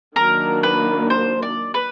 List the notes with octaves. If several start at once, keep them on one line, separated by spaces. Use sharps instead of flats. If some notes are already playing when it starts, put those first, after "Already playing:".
D#3 F#3 A#3 D4 A#4
B4
C5
D5
B4